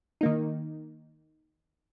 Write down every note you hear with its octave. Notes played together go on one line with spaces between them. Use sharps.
D#3 A#3 D#4